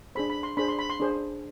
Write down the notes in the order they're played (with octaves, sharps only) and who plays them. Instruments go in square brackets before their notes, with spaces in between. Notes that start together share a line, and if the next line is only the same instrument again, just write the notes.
[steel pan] D4 G#4 C5 B5
B5
C6
D4 G#4 C5 B5
C6
B5
C6
D4 G#4 C5